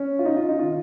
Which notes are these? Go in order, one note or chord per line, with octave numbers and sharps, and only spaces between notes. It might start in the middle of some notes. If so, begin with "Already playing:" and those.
Already playing: C#4
F4
D#4
F4
D#4
D#3 F4